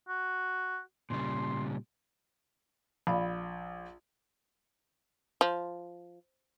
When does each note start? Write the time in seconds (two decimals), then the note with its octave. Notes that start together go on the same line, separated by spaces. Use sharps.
0.08 F#4
1.10 A#2 C#3 G3 C6
3.07 A#1 D5 F5 B5
5.41 F3